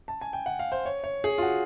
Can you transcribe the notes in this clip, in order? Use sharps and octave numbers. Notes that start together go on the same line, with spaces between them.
A5
G#5
G5
F#5
F5
C5
C#5
C#5
G#4
F4
F#4